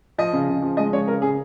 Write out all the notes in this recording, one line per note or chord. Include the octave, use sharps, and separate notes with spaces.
F3 D#5
C#3
C#3
F3
G#3 D#5
C#3 C#5
C#3 A#4
C#3 G#4